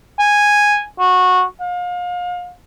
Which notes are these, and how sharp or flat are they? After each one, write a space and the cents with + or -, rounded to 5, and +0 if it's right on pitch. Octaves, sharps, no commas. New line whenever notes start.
G#5 -5
F#4 -15
F5 +35